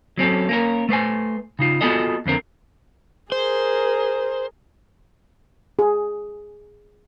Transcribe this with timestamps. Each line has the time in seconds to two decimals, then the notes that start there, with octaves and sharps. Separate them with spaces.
0.18 F#3 C4 C#4 A4
0.49 A#3 C#4 A#4
0.89 A3 B4 C5 G#5
1.59 C#3 D#4 F4
1.81 B3 F4 F#4 G#4 A4 D#5
2.26 F2 D3 C4 A#4
3.32 G#4 A#4 C5
5.79 G#4